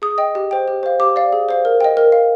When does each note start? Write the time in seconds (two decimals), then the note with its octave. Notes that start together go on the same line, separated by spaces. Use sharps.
0.02 G#4 D#6
0.18 D#5 G5
0.35 G4
0.51 C5 G5
0.68 G4
0.83 C5 F5
1.00 G4 D6
1.16 D5 F5
1.32 G#4
1.49 C5 F5
1.65 A#4
1.81 D#5 G5
1.97 A#4
2.12 F5